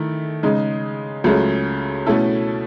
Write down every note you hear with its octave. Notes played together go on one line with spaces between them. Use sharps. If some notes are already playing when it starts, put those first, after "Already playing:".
Already playing: D#3 A3 E4
C#3 G#3 D#4
C#2 C#3 F#3 A3 C#4
B2 A3 C#4 E4 A4